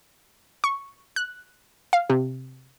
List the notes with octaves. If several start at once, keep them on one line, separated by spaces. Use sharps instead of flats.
C#6
F#6
F5
C3